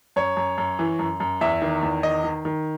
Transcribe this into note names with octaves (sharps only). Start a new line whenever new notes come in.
F#2 C#5
F#2
F#2
E3
F#2
F#2
E2 E5
D#3
E2
D#3 D#5
D#3
D#3